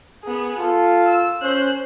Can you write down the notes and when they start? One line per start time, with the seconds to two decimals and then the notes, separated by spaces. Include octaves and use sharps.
0.24 B3 G#4
0.58 F4 A4
1.07 E6
1.42 C#4 C5 F#6